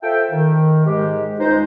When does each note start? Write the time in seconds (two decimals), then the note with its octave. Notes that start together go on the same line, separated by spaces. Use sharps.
0.03 F4 A4 C5 E5 G5
0.31 D#3
0.86 G#2 G#3 G4
1.39 C#2 G#3 D#4 C5